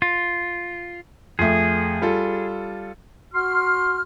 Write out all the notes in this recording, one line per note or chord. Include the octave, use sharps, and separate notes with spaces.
F4
F2 A3 G#4
G3 F4 A4
F#4 C6 F6